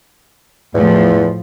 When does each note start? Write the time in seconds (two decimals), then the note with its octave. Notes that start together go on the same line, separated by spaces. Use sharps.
0.74 E2 A2 F3